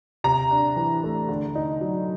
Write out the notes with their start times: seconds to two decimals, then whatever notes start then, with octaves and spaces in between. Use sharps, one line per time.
0.24 C3 A#5
0.51 D4
0.76 E3
1.03 A3
1.29 D3
1.55 D#4
1.81 F#3